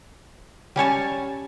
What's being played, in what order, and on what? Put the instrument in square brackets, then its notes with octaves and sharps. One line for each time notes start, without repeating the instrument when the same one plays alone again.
[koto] G3 C#4 C#5 A5